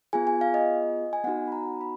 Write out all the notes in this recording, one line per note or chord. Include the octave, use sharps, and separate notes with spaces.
B3 F4 G#4 G#5
G#5
F5
D#5
G#5
B3 D#4 F#4 F#5
B5
A#5
B5